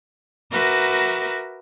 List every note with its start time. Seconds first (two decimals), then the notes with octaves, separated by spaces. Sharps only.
0.50 F#4 A#4 B4 E5 D6